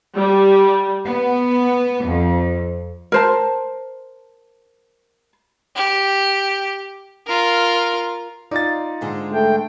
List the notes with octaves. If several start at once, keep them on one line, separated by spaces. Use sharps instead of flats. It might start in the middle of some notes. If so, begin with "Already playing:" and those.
G3
B3
F2
A#4 C5 A5
G4
F4 A#4
D#4 F4 D5 A6
G#2 D3 G#3
A3 G5